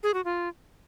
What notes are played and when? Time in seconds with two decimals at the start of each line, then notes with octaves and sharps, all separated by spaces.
0.03 G#4
0.14 F#4
0.25 F4